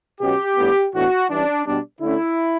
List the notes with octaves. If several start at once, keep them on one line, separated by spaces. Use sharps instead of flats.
B2 F#3 C#4 G4
A2 G3 B3 D4
A2 E3 B3 D4 F#4
E3 G3 C#4 D4
B2 G3 B3 D4
D3 A3 C#4 E4